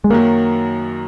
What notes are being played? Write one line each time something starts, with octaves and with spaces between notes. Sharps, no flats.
G#3
F#2 D#3 F#3 A#3